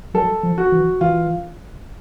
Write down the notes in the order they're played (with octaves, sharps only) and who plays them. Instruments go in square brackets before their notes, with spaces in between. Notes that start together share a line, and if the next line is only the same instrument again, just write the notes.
[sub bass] F#3 [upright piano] A4
[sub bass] F3
[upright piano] F#4
[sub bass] E3
[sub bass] E3 [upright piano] F4